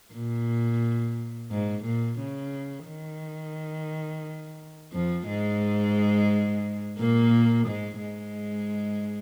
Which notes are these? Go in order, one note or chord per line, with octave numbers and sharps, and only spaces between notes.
A#2
G#2
A#2
C#3
D#3
F2 F3
G#2 G#3
A#2 A#3
G#2 G#3
G#2 G#3